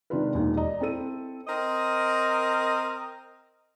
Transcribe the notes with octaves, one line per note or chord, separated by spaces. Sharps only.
C3 D#3 G#3 D4 F4 B4
E1 D#2 G4
D5 D#5 A#5
C4 E4 A4 D#7
C4 A#4 D#5